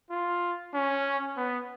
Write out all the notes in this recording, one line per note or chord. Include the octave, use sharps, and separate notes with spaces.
F4
C#4
B3